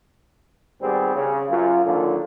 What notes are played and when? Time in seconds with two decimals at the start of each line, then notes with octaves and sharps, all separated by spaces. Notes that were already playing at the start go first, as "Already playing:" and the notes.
0.81 G#1 G3 B3 C4 G#4
1.15 C#3
1.50 F#2 F4
1.85 A#2 D3 D#3 F3 F#3